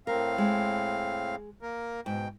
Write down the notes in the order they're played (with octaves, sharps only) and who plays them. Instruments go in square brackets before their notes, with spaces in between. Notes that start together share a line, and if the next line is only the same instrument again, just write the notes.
[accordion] A2 C4 F5 [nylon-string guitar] A#4
[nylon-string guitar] G#3
[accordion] A#3 A#4
[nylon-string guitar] G#2 [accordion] B2 G5